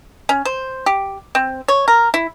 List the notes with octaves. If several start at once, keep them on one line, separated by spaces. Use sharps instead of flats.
C#4
C5
G4
C4
C#5
A#4
E4